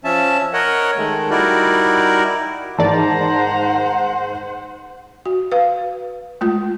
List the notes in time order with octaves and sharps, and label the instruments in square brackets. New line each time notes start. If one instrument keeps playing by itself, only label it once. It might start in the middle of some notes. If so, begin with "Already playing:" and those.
[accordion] F3 C#4 E5 A5
A#4 C#5 D#5 F#5
D#3 G#3 A3
G3 D#4 E4 F#4 A#4 D5
[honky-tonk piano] G#2 D#3 A5 [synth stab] E3 D5 [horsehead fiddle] C5 F#5 [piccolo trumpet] A#5
[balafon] F#4
B4 F5
G#3 A3 F4